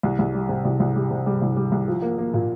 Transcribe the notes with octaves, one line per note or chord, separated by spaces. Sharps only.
C2
C2
G3
C3
C2
C2
G3
C3
G3
C2
G3
C2
F3
A#3
A#3
A#2